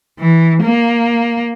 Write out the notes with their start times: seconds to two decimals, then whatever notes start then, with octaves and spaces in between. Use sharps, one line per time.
0.19 E3
0.64 A#3